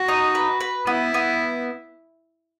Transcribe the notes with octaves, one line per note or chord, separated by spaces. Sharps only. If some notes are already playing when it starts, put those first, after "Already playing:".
Already playing: F#4
D#4
B4
B4
B3 E4
B3